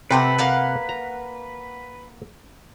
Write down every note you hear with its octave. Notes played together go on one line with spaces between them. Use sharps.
C3 A3 C4 B4 F#5
A#3 F5 F#5
A#5